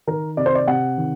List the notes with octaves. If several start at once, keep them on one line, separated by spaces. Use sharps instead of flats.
D#3 A#4
C3 D5
C5
D5
C3 F#5
D#3